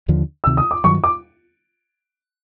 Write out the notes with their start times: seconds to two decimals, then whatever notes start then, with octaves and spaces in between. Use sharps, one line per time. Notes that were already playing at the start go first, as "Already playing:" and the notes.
0.08 D#2 D3 F3
0.44 D2 C3 D#3 E6
0.57 D#6
0.71 D6
0.84 G2 D#3 F#3 C#6
1.04 D6